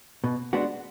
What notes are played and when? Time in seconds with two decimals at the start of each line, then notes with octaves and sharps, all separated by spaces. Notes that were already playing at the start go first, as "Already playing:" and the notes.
0.24 B2
0.53 G#3 B3 D4 F#4